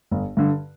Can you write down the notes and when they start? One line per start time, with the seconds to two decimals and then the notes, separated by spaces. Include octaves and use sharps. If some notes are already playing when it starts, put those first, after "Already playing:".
0.11 G1
0.37 G2 D3